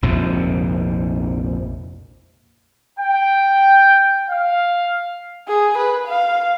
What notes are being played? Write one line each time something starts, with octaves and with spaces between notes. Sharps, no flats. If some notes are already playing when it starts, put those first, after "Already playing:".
A#1 F2 G#2 C3
G5
F5
G#4
B4
F5